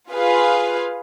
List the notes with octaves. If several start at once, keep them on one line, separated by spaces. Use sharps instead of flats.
F4 G#4 B4 F5